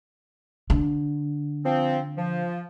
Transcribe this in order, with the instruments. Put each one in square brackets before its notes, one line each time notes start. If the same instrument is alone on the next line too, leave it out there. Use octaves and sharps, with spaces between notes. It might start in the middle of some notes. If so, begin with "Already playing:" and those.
[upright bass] D3
[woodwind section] F3 C4
F3